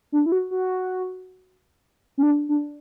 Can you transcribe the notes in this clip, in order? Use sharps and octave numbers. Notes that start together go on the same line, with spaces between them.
D4
E4
F#4
F#4
C#4
D4
D4